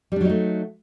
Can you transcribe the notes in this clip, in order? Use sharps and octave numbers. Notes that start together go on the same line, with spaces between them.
F#3 G3 A3 D4 D#4